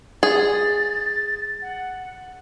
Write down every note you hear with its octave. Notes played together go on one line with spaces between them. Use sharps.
G#4 A6
F#5